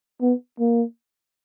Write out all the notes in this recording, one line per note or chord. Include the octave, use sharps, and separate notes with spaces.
B3
A#3